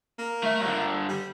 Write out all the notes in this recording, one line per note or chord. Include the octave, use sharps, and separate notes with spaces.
A#3
A3 E5
G2 D3
G3